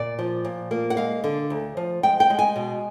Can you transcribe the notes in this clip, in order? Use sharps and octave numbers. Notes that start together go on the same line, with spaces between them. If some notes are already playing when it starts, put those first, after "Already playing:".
Already playing: A#2 D5
F3
A#2
A#3
F#5
G#3 F5
D3
D2
F3
G#3 G5
G5
G#3
G#5
B2